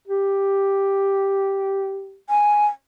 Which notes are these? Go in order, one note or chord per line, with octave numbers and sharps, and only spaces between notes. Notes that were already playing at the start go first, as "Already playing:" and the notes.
G4
G#5